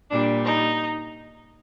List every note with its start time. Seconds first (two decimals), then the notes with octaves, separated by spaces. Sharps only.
0.10 A#2 G3 D4
0.45 D#4